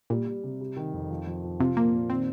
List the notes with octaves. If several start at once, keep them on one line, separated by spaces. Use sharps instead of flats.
A#2 G3
G3
C3
G3
D#3
F2
F3
F3
F3
C3 F4
A#2 A#3
A#2
D#3 C4